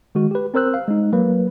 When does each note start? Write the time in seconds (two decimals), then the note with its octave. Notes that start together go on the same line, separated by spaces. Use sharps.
0.15 D#3 G#3 F#4
0.31 G4 B4
0.54 C4 A#4 C5 E6 F#6
0.74 F5
0.88 G#3 D#4
1.13 F#3 A#3 B4